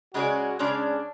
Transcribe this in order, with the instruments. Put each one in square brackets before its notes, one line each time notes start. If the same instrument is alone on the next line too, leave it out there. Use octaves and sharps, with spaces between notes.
[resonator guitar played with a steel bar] C#3 G#3 C#4 G#4 D5 [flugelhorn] F#4
[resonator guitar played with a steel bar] C#3 G#3 C#4 G#4 D5 [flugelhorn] D4